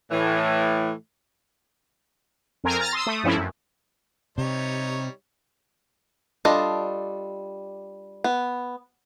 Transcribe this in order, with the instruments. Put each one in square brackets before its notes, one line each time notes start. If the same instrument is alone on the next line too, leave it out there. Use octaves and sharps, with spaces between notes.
[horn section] A2 E3
[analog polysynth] F2 C4 A#4 G#5 A#5
A#5 F6 A6 A#6
C6 D#6 E6
A3 D#6
G2 F3 A3 C4 C#4 E4
F#2
[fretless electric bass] C3 [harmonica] G3 D#4 C#5
[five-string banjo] G3 D4 F4 A4 D#5
B3